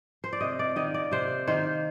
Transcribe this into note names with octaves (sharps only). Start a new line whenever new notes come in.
C5
D5
C3 D#5
D5
D#3 A#3 D#5
D5
C3 C5
D#3 A#3 C5